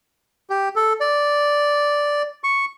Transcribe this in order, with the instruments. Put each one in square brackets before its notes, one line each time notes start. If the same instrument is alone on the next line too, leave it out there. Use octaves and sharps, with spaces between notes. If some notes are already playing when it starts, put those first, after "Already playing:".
[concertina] G4
A4
D5
C#6